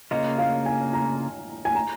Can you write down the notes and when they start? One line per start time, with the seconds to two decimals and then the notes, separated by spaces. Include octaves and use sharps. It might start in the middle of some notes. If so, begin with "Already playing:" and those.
0.11 C#3 A#3 F4 D#5
0.39 F5
0.66 G#5
0.93 A#5
1.65 G#5
1.75 A#5